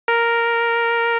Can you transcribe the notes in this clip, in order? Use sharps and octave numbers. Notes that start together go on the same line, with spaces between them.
A#4